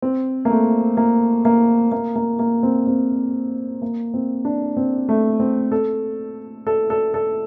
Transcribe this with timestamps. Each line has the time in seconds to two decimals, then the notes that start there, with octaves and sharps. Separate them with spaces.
0.02 C4
0.45 A#3
0.50 A3
0.97 A#3
1.45 A#3
1.92 A#3
2.16 A#3
2.39 A#3
2.63 C4
2.87 C4
3.82 A#3
4.14 C4
4.45 D4
4.77 C4
5.09 A3
5.40 C4
5.72 A4
6.67 A4
6.90 A4
7.14 A4